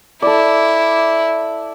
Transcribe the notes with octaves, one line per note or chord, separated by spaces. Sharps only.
E4 A4 D5